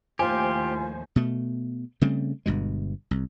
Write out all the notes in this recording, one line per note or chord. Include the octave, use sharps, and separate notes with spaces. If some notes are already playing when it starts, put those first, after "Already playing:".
D#2 A2 F3 F4 G4 C5 G#5
B2 A3
C#3 G3 A3 C4
G1 G2 B2 G#3
C2